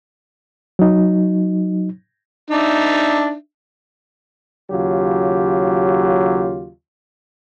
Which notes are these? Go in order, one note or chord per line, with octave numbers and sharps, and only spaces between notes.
F#3 D#4
D4 D#4 E5
D#2 C#3 F#3 F4 G4